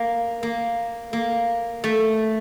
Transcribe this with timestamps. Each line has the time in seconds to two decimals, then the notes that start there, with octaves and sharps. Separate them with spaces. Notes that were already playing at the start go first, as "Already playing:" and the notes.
Already playing: A#3
0.43 A#3
1.13 A#3
1.84 A3